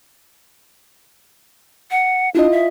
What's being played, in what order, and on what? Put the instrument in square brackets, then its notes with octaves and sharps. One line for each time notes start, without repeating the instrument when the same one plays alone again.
[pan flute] F#5
[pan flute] D4 [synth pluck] E4 F4 D#5
[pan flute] E5